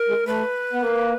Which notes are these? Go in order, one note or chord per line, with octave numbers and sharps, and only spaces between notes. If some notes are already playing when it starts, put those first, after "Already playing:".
Already playing: A#4
G#3
A3 B4
B3
A#3